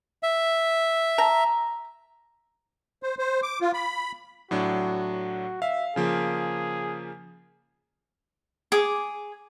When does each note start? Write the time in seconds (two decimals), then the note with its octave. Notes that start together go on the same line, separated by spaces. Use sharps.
0.23 E5
1.18 A#5
3.03 C5
3.19 C5
3.43 D6
3.61 F4
3.74 B5
4.51 A2 F#3 D4 F#4
5.62 E5 F5
5.96 C#3 F3 A#3 G#4
8.72 G#4 D6